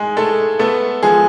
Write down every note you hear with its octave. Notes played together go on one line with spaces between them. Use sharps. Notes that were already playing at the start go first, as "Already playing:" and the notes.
Already playing: G#2 G#3 G#4
G#3 A3 A4
A3 B3 A4
F3 G#3 G#4